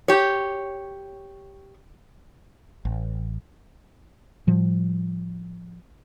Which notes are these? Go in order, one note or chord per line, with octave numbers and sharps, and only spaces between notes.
G4 C#5
A1
A2 F3 G3